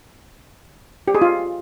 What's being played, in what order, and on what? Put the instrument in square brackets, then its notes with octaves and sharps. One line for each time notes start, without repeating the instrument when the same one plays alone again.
[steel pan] G4
G#4
F4